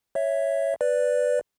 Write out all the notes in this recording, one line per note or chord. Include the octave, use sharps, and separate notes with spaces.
C#5 E5
B4 D5